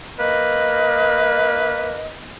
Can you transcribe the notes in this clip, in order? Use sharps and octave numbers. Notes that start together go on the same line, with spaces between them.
A#3 B4 D#5